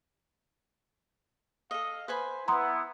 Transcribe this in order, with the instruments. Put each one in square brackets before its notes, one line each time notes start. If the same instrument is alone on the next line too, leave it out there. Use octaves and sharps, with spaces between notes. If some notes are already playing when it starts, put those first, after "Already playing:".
[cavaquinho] A4 D#5 [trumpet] F5
[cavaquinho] B4 G#5 B5 [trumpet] C5
[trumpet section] B3 E4 [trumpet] F#5 [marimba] A#5 C6 D#6